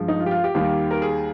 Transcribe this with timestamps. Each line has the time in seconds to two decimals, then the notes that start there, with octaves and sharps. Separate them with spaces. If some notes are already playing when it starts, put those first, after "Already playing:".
Already playing: G2 F3 G#3
0.08 D#4
0.20 F4
0.26 G4
0.31 F4
0.44 G4
0.55 D#2 D#3 G3 A#3
0.91 A#4
1.02 G#4